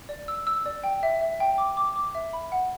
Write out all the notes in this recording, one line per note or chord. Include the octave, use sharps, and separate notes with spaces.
D5
E6
E6
D5
G5
E5
E5
G5
D6
D6
D6
E5
B5
F#5